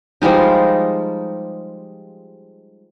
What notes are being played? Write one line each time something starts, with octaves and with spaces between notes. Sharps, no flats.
F3 G3 G#3 D#4